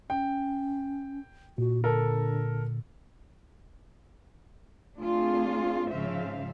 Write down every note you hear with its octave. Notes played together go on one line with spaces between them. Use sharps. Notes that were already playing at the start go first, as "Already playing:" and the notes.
C#4 G5
A#2 F#4
D3 A4 A#4
A3 C4 D4 F4 G#4
G#2 C#3 F3 C5 E5 F5